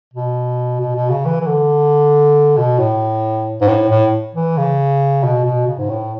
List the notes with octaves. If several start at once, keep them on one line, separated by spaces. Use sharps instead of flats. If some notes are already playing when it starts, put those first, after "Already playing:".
B2
B2
B2
C#3
E3
E3
D3
B2
A2
G#2
A2
A2
E3
C#3
B2
B2
C#3
G#2
A2